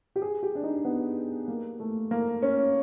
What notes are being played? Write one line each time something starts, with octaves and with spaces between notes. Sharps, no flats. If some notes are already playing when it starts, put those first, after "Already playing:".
G4
G#4
G4
D4
D#4
B3
A#3
A3
A#3
C#4